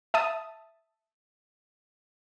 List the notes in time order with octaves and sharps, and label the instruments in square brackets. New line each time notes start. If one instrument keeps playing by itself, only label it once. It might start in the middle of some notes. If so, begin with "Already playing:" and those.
[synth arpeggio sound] E5 A5 D#6